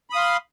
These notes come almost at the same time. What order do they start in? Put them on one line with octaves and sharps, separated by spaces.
B5 D#6 F5 C6